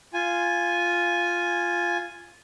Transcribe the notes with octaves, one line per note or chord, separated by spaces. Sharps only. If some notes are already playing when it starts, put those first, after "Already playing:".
F4 G#5